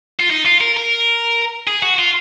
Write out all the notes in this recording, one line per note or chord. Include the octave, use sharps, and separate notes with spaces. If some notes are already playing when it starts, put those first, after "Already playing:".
F4
D#4
F4
A#4
A#4
G#4
F#4
F4